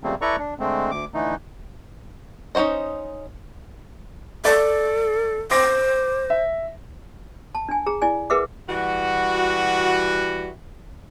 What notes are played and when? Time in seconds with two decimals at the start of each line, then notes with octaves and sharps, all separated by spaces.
0.04 C#3 F3 G3 A3 A#3 C4
0.22 E4 A4 B4 D5 A#5 C#6
0.39 D4
0.59 D3 G#3 A3 C4
0.91 D2 D6
1.14 D3 E3 A3 D#4
2.55 C#4 D#4 F#4 C5 D#5
4.45 A4 D5
5.51 C5 D6 A#6
6.30 E5
7.55 A5
7.69 D4 G#5
7.86 G#4 A#5
8.02 E4 D5 G#5
8.30 G#4 A#4 B4 E5 F#5 D6
8.68 E3 G3 F#4